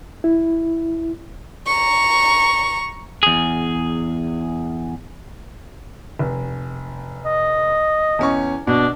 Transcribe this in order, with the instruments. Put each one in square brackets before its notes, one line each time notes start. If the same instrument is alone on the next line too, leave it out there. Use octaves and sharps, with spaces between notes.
[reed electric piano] E4
[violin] A#5 C#6
[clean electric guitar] E2 G#4
[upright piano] F1
[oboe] D#5
[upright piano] E2 C#4 C#6
[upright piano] B2 [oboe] D4